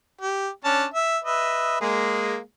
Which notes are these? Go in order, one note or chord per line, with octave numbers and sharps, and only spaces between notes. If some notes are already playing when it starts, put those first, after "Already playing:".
G4
C#4 D4 A5
E5
B4 D#5 E5
G#3 A#3 G#4